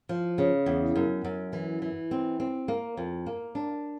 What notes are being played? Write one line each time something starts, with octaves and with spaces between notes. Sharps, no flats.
F3
C#3
E2
F#2
F#2
E3
E3
C4
C4
A#3
F2
A#3
D4